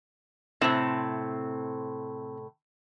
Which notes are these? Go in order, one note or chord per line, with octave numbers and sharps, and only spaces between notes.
A2 C3 C4